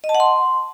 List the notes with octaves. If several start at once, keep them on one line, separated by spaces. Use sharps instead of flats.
D#5
A5
F#5
C6